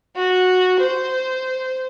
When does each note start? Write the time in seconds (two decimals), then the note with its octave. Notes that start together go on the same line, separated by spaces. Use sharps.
0.16 F#4
0.80 C5